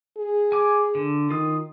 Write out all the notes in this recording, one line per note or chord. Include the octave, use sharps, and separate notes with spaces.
G#4
G#5 D6
D3
D#3 F4 D#6